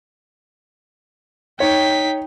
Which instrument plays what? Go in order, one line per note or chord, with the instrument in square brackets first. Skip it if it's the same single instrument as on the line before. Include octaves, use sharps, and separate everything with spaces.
[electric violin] D#4 B6 [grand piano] C#5 [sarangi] G5